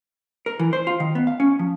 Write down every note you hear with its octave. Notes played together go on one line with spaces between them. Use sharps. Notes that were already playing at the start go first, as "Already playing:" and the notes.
A#4
E3
C5
F4
D#3
B3
F5
C#4
F3